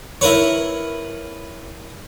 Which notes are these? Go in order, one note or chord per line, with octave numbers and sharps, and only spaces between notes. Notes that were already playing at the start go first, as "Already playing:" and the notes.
E4 A#4 B4 C#5